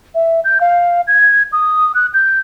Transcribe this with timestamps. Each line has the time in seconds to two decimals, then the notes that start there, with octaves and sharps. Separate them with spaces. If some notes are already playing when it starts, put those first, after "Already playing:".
0.15 E5
0.44 G6
0.61 F5
1.07 G#6
1.52 D#6
1.95 F#6
2.14 G6